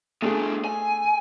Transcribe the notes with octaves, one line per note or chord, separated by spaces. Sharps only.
A3 B3 D4 G#4
G#5